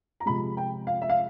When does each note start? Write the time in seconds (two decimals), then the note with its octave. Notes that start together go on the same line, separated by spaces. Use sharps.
0.20 A#5
0.26 C3 F3 G#3 B5
0.57 G5
0.87 F5
1.02 E5
1.09 F5